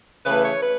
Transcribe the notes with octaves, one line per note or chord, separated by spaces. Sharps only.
C#3 E3 A3 B4
C#5
B4